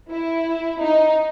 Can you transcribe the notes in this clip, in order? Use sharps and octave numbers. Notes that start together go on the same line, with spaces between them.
E4
D#4